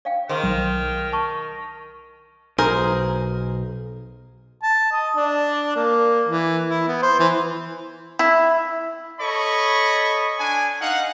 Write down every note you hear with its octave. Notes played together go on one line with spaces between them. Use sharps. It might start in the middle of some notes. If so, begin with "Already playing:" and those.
D5 F5 G5
D#3 G#4 C5 G5 C6 F6
B1
A5 C#6
B1 G#4 A#4 C5
A5
D#5
D4
A#3
E3
E4
B3
C5
E3
E4
A4 C#5 D#5 B5 C#6
D4 G#5
D#4 F5 F#5